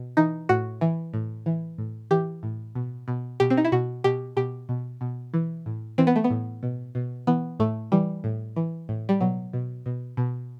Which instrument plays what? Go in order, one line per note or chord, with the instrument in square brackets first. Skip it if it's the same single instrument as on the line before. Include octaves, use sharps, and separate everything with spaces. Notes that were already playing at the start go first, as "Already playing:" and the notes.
Already playing: [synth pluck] B2
E3 D#4
A2 F#4
E3
A2
E3
A2
E3 G4
A2
B2
B2
B2 G4
C4
D#4
E4
B2 F#4
B2 G4
B2 G4
B2
B2
E3
A2
E3 C4
B3
A3
B3
A2
B2
B2
E3 B3
A2 A3
E3 G3
A2
E3
A2
G3
B2 F#3
B2
B2
B2